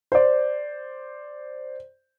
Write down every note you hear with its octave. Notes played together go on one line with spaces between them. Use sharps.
C5 D5